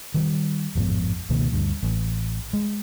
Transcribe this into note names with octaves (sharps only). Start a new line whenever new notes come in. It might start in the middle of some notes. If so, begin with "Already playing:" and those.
D#3 F#3 G3
A1 F2 G#2 B3
C#2 B2 D#3 A#3
D2 G2
A1
G#3